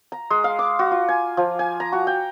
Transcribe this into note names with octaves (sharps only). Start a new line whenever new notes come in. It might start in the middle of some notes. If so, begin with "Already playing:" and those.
A#5
G#3
F5
D6
F#4
F4
G#5
F3
G#5
A#5
F#4
G5